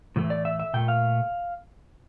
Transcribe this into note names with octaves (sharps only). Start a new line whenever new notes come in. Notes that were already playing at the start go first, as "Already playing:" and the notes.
A2 E3 A3
D5
E5
E5
A#2 A3 G5
F5